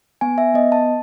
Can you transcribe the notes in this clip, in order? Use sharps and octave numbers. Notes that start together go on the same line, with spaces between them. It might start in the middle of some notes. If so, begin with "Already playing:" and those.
B3 G#5
E5
B3 D#5
A5